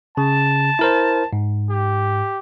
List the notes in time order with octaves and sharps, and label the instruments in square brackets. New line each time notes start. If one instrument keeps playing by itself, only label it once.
[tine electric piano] C#3 [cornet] A5
[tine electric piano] E4 A#4 C5
G#2
[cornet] G4